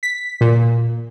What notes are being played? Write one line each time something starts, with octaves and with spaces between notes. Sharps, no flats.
B6
A#2